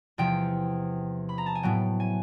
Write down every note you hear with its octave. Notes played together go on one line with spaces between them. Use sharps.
E2 C3 F3 G5
B5
A#5
A5
G#5
A2 F#3 B3 G5
G#5